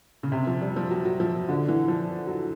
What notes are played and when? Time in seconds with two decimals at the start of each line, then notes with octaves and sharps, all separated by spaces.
0.23 C#3
0.32 C3
0.47 F3
0.61 G3
0.76 F3
0.91 F#3
1.05 F#3
1.20 F3
1.49 D3
1.68 E3
1.88 F3
2.27 F#3